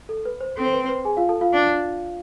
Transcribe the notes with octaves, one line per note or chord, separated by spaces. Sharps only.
A4
B4
C5
C4 A4
C5
B4
C5
B4
G#4 G#5
F4 F5
A4 A5
F4 F5
D4